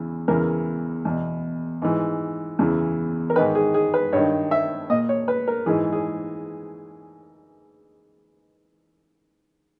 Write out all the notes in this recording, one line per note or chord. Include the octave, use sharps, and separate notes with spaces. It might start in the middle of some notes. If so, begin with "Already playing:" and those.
Already playing: E2 C#3 E3
E2 C#3 E3 A#4
E2 B2
G#2 E3
E2 C#3 E3
A#4
G#2 D#3 B4
G#4
G#4
B4
G2 D#3 C#5
E5
A#2 D#5
C#5
B4
A#4
G#2 E3 G#4
G#4